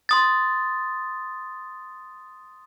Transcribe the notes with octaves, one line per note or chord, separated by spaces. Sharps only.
C6 D#6 A6